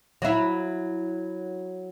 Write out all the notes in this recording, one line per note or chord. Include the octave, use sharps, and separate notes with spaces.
F#3 E4